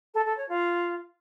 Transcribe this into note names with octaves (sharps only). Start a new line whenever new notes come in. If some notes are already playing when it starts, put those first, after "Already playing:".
A4
A4
C#5
F4